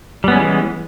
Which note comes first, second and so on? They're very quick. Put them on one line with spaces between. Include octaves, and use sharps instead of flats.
G3 B3 C#4 G#3 E3